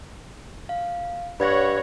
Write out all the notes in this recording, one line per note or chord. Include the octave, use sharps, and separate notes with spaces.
F5
G2 C#5 F#5 B5 G#6 A#6